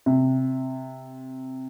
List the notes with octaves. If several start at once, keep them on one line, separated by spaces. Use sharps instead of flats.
C3